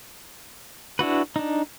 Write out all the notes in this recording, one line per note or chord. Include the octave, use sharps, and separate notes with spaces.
D4 E4 F#4 B4
D4 D#4